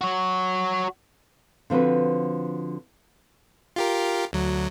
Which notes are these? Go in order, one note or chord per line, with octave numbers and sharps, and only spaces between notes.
F#4 C#5
D3 F3 C4 F#4 B4
F4 G4 A#4
D2 F#3